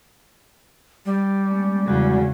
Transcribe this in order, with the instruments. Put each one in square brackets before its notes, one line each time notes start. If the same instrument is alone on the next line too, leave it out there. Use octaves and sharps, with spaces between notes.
[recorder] G3
[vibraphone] G#3 A#3 C#4
[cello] E2 C#3 [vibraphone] G#3 F#4 F#5